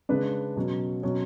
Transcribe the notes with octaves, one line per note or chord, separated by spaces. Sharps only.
C#3 G#3 D4 B4
B2 F#3 C#4
B2 F#3 C#4 C#5